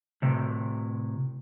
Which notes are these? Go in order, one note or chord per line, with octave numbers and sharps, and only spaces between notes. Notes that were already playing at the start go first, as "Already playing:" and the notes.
A2 C3